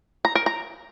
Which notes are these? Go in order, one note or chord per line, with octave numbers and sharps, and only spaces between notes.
A#5
A#4
A#5